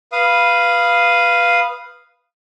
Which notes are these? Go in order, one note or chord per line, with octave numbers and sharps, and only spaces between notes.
B4 F5 D#6